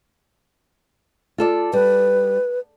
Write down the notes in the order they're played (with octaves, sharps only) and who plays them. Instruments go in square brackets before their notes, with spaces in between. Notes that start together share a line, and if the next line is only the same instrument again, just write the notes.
[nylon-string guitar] F4 A4 D5
[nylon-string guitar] G3 [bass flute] B4